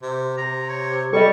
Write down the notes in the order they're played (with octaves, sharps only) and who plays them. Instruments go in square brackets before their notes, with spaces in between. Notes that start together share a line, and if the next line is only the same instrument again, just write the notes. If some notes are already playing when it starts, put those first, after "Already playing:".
[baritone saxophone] C3
[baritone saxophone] C3 [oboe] A#5
[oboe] C#5
[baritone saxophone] F#3 [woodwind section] G3 [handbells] A4 D#5 [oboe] C#6